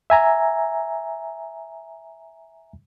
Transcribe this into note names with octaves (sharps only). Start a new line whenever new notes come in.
E5 G#5 A#5